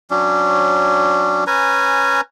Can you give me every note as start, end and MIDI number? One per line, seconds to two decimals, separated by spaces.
0.10 1.44 54
0.10 1.44 61
0.10 1.44 62
1.47 2.21 61
1.47 2.21 71
1.47 2.21 80
1.47 2.21 82